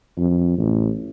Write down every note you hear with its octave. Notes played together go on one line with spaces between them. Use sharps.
F2
A1